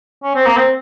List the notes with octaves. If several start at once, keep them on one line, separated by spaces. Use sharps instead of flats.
C#4
C4
A#3
C4